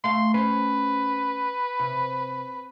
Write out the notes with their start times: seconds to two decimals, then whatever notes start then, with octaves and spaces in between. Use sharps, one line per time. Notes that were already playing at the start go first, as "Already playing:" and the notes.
0.04 A3 F5 C6
0.34 C#4 B4 C5
1.79 C3